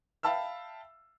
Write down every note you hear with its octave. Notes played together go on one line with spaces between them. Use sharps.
E5 F5 G5 A5 B5 E6